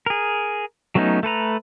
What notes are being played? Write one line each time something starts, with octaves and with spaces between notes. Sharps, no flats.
G#4 A#4
F#3 A3 B3 C#4 D#4
A3 A4 B4 A#5